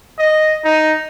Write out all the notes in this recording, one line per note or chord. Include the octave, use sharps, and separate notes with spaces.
D#5
D#4